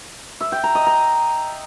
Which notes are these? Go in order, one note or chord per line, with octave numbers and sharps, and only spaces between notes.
E5
G5
A#5
D#5
A#5